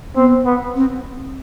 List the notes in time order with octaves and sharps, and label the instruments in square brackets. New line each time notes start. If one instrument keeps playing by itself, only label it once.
[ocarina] B3 [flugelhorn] C4
[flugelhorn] B3
[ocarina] C4